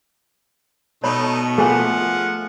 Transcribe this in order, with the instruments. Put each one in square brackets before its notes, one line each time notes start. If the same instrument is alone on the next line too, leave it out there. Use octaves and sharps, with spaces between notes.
[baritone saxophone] B2 [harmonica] A3 D#4 [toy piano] C#5 B5
[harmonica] F3 F#5 [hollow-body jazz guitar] A3 [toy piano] G#4 A#4 G#5